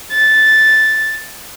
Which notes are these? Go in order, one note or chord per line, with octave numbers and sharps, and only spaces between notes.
A6